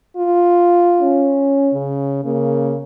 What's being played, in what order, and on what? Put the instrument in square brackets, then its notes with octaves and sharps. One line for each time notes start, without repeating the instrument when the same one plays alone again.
[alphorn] F4
[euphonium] C#4
[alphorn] C#3
[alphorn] C#3 [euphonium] A#3